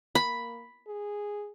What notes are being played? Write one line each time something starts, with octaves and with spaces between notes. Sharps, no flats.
A#3 B5
G#4